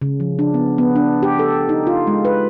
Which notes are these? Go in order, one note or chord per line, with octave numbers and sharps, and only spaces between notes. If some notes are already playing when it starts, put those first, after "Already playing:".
C#3
F3
D4
B3
B3
D4
G4
A4
D#4
F4
G#3
B4